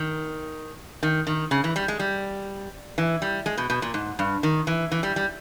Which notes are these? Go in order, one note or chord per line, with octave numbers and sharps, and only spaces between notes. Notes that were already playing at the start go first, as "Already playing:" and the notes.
Already playing: D#3
D#3
D#3
C#3
E3
G3
G#3
G3
E3
G3
G#3
B2
B2
A#2
G#2
G2
D#3
E3
E3
G3
G3